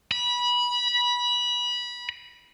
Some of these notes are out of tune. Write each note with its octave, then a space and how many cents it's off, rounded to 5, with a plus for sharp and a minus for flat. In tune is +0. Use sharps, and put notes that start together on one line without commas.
B5 -20